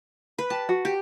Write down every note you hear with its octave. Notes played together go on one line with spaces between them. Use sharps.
B4
G4 A5
F#4
G4